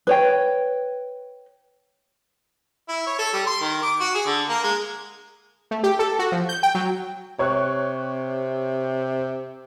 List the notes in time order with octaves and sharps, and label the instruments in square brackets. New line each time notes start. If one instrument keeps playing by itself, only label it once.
[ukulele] B4 C#5 G5
[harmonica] E4
C#5
A4
G3
C6
D#3
D6
F#4
G#4
D3
A#3
G#3
[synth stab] A3
G4
A4
F#4
F3
G6
G5
F#3
[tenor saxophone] C3 [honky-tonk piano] C#5 C#6 F#6